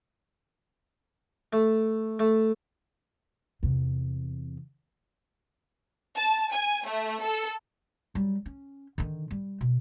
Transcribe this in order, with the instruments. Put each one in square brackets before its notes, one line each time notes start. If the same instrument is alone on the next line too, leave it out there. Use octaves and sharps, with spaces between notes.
[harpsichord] A3
A3
[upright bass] E2 C3
[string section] A5
G#5
A3
A4
[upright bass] F#3 G3
C#4
D3 D#3
G3
B2